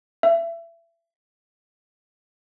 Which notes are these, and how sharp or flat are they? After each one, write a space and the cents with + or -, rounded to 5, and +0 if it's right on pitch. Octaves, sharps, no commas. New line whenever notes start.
E5 +30